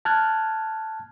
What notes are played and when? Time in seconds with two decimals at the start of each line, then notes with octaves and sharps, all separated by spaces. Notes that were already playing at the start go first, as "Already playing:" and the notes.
0.05 A5 F6 F#6 G#6